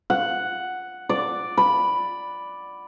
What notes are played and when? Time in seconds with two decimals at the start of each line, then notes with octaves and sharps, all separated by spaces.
0.10 F#5
1.09 D5
1.57 B5